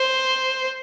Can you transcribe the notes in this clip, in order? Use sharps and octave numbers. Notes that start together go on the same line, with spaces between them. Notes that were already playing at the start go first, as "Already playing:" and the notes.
Already playing: C5